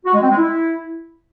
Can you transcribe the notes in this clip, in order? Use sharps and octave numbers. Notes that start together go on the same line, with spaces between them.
F#4
G#3
C4
G#3
E4